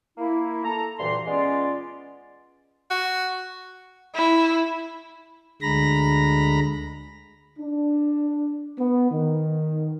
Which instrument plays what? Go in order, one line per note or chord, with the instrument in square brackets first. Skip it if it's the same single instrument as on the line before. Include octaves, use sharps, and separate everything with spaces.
[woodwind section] A#3 E4
A4 A#5
D2 G2 A#2 E3 C6
G#3 B3 C#4 F4 D5
[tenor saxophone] F#4
[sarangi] E4
[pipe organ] D2 D3 G#3 A#5 B5 A#6
[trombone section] D4
B3
D#3